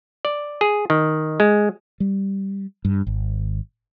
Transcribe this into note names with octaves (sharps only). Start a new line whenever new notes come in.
D5
G#4
D#3
G#3
G3
G2
G#1